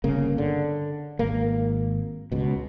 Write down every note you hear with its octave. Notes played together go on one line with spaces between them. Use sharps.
G1 C#3 A#3
D3
G#1 A#3
C#2 B2